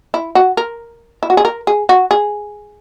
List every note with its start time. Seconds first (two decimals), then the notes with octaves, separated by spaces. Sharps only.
0.14 E4
0.35 F#4
0.57 A#4
1.23 E4
1.30 F#4
1.37 G#4
1.45 A#4
1.67 G#4
1.89 F#4
2.11 G#4